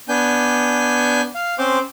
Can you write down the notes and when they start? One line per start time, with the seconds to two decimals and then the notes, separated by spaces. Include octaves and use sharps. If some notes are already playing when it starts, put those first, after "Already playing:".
0.09 B3 D4 G#5 G6
1.35 F5
1.59 C4 C#4 C5 C6 D6